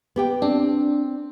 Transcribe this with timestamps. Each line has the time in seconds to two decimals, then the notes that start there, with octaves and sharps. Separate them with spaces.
0.16 B3 G4 G5
0.42 C4 D4